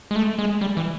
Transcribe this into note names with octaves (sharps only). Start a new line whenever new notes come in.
G#3
A3
G#3
G3
E3